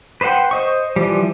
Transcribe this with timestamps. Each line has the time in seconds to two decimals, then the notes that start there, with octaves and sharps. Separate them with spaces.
0.21 B4 C5 D5 F#5 G5
0.51 C5 D#5 C#6
0.96 E3 F3 G3